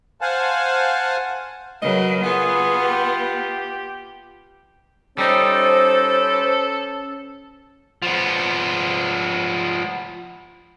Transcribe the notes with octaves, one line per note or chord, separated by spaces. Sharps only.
C5 F5 F#5 G#5 A5
C#3 F#3 A#4 B4 D#5
B3 F4 G#4 B4 F#5
G4
G3 C#4 D#4 A4 C5
F3 B3